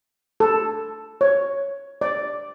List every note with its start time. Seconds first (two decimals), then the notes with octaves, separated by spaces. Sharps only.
0.40 A4
1.21 C#5
2.01 D5